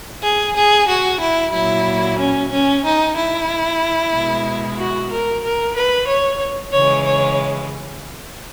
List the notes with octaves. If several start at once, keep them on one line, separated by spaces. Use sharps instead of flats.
G#4
G#4
F#4
E4
A#2 F#3 E4
C#4
C#4
D#4
E4
B2 G#3
F#4
A#4
A#4
B4
C#5
C#3 E3 G#3 C#5
C#5